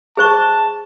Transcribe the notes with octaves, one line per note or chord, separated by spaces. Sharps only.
G#4 C5 A5 C#6